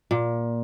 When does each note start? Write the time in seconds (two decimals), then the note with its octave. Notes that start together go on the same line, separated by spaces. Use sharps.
0.11 A#2